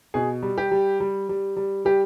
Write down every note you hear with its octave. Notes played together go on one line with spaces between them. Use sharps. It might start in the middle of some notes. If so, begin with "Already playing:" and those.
B2 G#4
G3
G4
G3
G3
G3
G3
G3 G4